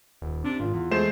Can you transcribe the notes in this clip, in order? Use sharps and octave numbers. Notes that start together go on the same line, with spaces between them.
D#1
C3 D4
G#1 F4
E2
G#3 A3 C5 E7